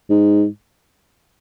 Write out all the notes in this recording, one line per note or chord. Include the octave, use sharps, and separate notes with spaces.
G#2